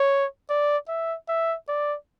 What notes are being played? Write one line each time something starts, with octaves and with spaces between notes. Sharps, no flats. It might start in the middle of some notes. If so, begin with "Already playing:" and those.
Already playing: C#5
D5
E5
E5
D5